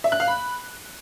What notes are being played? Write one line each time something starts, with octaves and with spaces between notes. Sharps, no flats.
E5
F#6
F5
B5